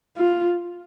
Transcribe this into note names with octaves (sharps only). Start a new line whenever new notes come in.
F4